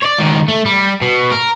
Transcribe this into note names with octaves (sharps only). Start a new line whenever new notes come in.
C#5 D5
C#2 D#3
A3
G3
B2
A#4